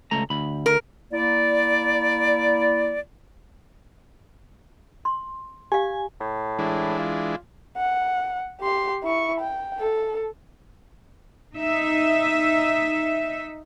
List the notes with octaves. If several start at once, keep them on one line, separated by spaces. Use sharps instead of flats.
C#2 A3 A#5
D2 B5
A#4
A#3 E4 D5
C6
G4 F5 G#5
A2
E3 G#3 D4
F4
F#5
G4 C6
E4 C#6
G5
A4
D#4 E5